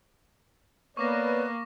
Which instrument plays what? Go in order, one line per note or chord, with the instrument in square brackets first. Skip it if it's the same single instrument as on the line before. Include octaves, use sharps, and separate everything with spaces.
[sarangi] A#3 [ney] B3 [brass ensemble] B4 C#5 D5 [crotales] C#6 D6 A#6